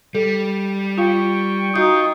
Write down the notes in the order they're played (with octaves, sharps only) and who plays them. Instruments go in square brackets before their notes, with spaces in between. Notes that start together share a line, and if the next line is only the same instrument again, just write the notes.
[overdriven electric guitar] G3 [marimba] A4
[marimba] F4 F5 [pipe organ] G5 C#6
[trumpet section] D#4 D#6 [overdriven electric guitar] F4 [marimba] F#4 G6